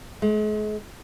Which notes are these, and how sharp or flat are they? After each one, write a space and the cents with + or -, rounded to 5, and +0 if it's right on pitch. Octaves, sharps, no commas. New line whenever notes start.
G#3 +40